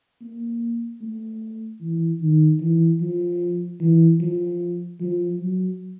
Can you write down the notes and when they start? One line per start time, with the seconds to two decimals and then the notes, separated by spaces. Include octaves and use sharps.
0.22 A#3
1.01 A3
1.81 E3
2.21 D#3
2.61 E3
3.01 F3
3.81 E3
4.20 F3
5.01 F3
5.40 F#3